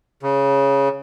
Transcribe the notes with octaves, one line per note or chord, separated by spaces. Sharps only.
C#3